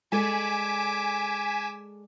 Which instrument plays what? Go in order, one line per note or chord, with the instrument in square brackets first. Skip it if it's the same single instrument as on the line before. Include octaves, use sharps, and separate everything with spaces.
[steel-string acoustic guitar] G#3 A4 D5 [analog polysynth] G#5 B6 E7 [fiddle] D6